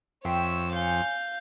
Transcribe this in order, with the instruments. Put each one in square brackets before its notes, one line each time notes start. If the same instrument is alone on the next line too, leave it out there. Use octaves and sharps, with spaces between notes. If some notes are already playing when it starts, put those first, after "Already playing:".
[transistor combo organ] F2 [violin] C#5 E6 [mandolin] E5 G5 C6
[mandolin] C#5 G#5 [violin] F5 G6